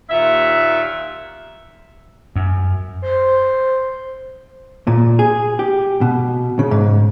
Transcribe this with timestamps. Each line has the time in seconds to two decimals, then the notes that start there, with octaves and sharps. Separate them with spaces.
0.09 D#2 A#2 E5
2.36 F#2
3.02 C5
4.87 A#2
5.19 G#4
5.59 G4
6.01 B2
6.59 C#3
6.71 G#2